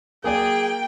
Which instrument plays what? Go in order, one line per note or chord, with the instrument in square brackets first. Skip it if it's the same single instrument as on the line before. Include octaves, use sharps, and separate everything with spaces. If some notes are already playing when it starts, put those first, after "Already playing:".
[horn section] F#3 G#4 [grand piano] A#3 D5 [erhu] G5